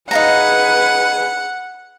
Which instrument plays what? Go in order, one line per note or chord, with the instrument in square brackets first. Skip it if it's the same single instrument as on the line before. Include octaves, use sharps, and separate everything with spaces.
[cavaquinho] D#4 F5 A#5 [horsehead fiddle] G#4 B4 [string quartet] F#5